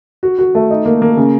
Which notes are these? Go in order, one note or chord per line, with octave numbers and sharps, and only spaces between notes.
F#4
F#4
A3
D#4
A#3
A#3
C#3